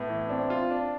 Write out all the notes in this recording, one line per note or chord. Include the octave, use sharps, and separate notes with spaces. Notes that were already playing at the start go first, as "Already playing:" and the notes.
Already playing: A2 B3
E3
C4 D4
F4
D4